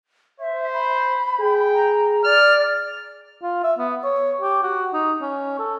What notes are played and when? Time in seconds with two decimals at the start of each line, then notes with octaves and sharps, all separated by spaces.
0.40 C5 E5
0.74 B5
1.41 G#4 G5
1.74 A#5
2.24 D5 F6
3.42 F4
3.64 E5
3.79 B3
4.04 C#5
4.41 G4
4.63 F#4
4.94 D#4
5.21 C#4
5.59 A4